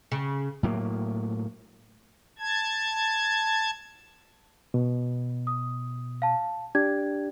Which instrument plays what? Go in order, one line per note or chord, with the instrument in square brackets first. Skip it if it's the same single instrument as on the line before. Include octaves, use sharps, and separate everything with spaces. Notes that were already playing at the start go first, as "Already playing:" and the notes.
[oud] C#3
[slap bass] A2 F#3 A#3
[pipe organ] A5 G#6
[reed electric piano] B2
[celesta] D#6
F5 A5
[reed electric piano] D4 G4 [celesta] G#6